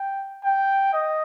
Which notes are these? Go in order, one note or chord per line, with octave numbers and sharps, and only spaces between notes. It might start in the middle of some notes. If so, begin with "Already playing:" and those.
Already playing: G5
G5
D#5